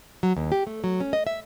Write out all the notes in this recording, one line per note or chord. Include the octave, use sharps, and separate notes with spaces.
F#3
D#2
G4
A3
F#3
C#4
D#5
E5